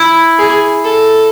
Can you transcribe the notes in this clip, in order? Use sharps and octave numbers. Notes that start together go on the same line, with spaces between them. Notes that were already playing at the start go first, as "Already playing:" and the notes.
Already playing: E4
G#4
A4